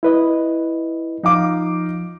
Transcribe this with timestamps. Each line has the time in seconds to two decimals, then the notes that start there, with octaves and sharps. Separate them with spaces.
0.03 E4 B4 D#5
1.23 F3 D#4 F5 D6